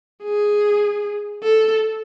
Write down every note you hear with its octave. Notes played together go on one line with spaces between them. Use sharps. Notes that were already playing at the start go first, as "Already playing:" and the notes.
G#4
A4